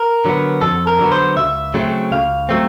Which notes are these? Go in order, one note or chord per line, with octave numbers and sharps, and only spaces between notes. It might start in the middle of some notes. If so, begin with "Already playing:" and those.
Already playing: A#4
D3 F#3 B3
F2 A4
A#4
D3 F#3 B3
C5
C#2 E5
C#3 F#3 A3 C4
C#2 F5
F#3 A3 C4